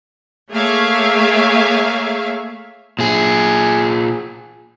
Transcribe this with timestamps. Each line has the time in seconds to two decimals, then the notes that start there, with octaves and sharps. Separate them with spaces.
0.50 A3 A#3 G#4 C#5 E5 F5
2.99 A#2 G#4